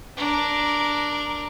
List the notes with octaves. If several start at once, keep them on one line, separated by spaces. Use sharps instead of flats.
D4 A#4